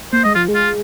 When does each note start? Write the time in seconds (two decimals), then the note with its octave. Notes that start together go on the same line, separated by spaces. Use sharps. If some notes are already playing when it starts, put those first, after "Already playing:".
0.13 A#3 C5
0.24 G#3 D#5
0.35 F3 F4
0.48 G#3
0.54 F4